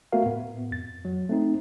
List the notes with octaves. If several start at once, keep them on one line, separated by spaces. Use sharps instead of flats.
A3 B3 F#4 A#4 E5 F5
A2 B3
F2 A6
F#3
A3 C4 D#4